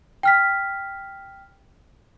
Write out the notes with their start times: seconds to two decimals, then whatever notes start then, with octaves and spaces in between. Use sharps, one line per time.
0.23 G5 F6 B6